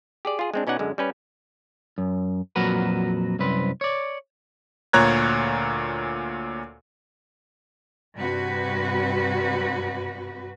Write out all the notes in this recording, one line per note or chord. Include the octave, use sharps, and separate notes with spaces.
G4 G#4 D5
F4 G#4
G#3 C4 D4
B2 C#4 D#4 D5 F#5 G#5
F#2 D3 G#3
G3 C#4 B4
F#2
F2 A#2 F#3 F#4 A#4 B4
C2 F#2 C4 B4
C#5 D5
D2 A#2 C#5 A#5 F#6 G#6
G2 C3 F#4 B4